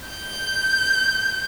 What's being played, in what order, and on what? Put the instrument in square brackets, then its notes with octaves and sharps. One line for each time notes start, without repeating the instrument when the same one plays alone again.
[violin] G6